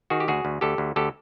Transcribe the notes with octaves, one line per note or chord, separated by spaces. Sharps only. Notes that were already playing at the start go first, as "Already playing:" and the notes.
D#3 F#4 G#4
G4
D2 F#4 G#4
D2
D2 G4 A4
D2
D2 G4 A4